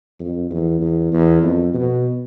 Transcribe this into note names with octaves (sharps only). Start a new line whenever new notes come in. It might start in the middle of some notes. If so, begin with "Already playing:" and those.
F2
E2
E2
E2
F2
B2